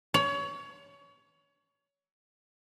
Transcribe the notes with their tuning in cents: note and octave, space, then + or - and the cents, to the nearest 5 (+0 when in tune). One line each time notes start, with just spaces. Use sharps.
C#5 +25